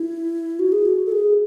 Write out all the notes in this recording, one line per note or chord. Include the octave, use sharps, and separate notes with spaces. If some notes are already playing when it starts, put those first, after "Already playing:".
Already playing: E4
F#4
G#4
F#4
A4
G#4